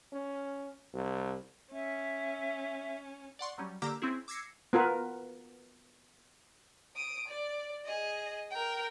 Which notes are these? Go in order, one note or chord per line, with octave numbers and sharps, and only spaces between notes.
C#4
C2
C#4 E5
D5 F#5 C6 C#6
F#3 G3 C#4
D3 A#3 G4 A#5 D6 E6
C4 C#4 E4 G#4
D6 E6 G#6 A#6 C7 C#7
B3 F4 A#4 B4
D#6 D7
D5
G#4 D#5
A#4 G5